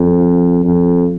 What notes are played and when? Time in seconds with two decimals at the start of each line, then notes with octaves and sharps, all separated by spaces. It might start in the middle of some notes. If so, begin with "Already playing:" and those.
Already playing: F2
0.64 F2